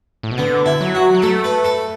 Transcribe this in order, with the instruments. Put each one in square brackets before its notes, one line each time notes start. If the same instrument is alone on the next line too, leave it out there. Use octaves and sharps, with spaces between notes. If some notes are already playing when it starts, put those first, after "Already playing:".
[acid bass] A2
B2
[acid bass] D3 [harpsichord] B3
[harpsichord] E4
[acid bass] F#3
[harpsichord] F#4
[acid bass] F#3
[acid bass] A3 [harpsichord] A4
[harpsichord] B4
A4